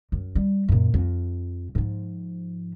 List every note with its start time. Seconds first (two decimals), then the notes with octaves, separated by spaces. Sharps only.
0.12 F#2
0.35 G3
0.68 F#2 A#2
0.94 F2
1.75 G#2 F3